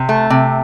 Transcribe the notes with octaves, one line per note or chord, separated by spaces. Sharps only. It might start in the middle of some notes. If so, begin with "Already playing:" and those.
Already playing: C3
A3
C3